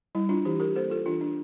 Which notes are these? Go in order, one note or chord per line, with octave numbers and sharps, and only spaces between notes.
G3 E4
D4 F4
E3 E4 G4
G4 A#4
A#3 A4 C5
F4 A4
E3 D4 F4
D4